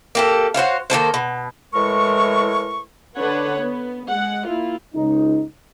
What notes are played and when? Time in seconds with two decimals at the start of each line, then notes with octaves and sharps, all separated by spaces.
0.15 A#3 G4 A4
0.54 F#4 C5 C#5 F5
0.90 D#3 A#3 A4 C5
1.14 B2
1.73 A2 E3 G#3 A#4 C#6
3.17 D3 D4 B4 C#5 F#5
3.60 B3
4.09 G#3 F#5
4.46 A#3 E4 F4
4.95 C#2 D#4